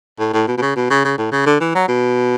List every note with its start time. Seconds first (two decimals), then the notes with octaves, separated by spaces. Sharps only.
0.19 A2
0.33 A2
0.47 B2
0.57 B2
0.62 C#3
0.76 B2
0.90 C#3
1.05 C#3
1.18 A2
1.32 C#3
1.46 D3
1.60 E3
1.75 F#3
1.88 B2